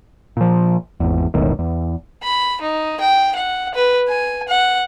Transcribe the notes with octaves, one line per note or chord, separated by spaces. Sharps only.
A#2 F3
G#1 E2
E1 B1 A2 D#3
E2
B5
D#4
G5
F#5
B4
G#5
F#5